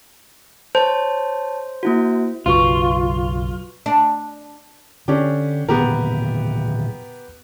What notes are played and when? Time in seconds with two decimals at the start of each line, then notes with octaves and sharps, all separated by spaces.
0.75 C5 C#5 A5
1.83 A#3 E4 F#4
2.46 B1 F#2 C#3 F4 F#4 B4 C#6
3.86 D4
5.08 D3 C#4 D4 G4
5.69 A#2 D3 D#3 B3 G4 A#4